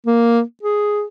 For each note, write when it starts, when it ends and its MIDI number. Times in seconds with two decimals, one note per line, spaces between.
0.06 0.42 58
0.63 1.04 68